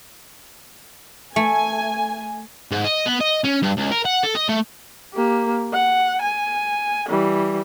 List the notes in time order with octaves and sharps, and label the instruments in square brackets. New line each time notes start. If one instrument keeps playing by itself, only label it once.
[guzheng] A3 [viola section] G#5
[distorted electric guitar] G#2
D#5
B3
D#5
C#4
G2
C#2
A#4
F#5
A4
D#5
A3
[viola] A#3 G4
F#5
G#5
E3 G3